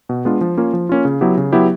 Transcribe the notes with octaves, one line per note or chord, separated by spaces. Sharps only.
B2
G#3 B3 D4 F4
F3
A#3 C#4 F4
F3
A#3 C#4 F4
C#3
F#3 B3 E4 G4
C#3
F#3 B3 E4 G4